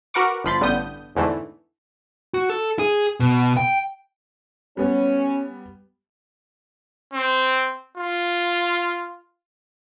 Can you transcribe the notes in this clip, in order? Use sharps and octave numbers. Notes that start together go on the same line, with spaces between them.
F#4 A#4 B4 F#5 C#6 D6
G1 F3 B5 C6 A6
A1 G2 D3 B3 D#6 G6
E2 G#2 D3 E3 A3
F#4
A4
G#4
B2
G5
G3 B3 C#4
C4
F4